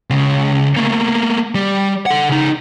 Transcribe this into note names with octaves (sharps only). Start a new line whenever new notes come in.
C#2 C#3
A3 A#3
G3
A4 F#5
C#3 D#4